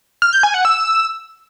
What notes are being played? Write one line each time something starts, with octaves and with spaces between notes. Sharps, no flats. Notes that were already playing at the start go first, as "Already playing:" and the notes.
F6
G6
G#5
F#5
E6